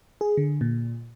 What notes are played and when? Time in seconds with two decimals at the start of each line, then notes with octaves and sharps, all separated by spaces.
0.21 G#4
0.37 D3
0.61 A#2